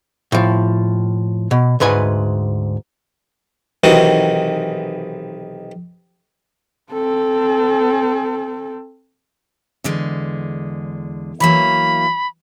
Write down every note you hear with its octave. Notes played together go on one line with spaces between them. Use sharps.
A2 F3
B2
D2 G#2 B4 G#5
B1 C3 D#3 E3 F#4
C4 A4
E2 D3 G#3
E3 F#3 A#3 B5